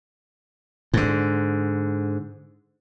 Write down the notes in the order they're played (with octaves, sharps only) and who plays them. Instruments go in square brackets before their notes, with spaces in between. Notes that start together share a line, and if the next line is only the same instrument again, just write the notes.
[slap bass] G#2 D3